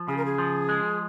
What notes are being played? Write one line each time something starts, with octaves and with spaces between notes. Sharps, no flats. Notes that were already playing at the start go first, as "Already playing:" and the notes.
Already playing: F3
C#3 G#4
A#4
G#4
F3
G#3